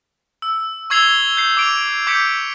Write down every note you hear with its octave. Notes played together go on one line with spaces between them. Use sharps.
E6
C#6 E6 G#6 C7 F7 G7
G6 C7
D6 D7 F7
D6 G6 B6 C#7 D7